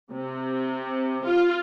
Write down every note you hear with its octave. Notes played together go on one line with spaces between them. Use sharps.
C3
F4